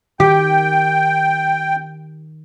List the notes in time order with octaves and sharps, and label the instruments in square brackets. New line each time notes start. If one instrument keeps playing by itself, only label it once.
[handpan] D#3 [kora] G4 [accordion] G5